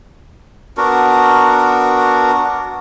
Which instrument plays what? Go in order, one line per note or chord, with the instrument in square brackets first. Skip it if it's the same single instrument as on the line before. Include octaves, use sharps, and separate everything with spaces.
[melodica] B3 D4 F#4 A#4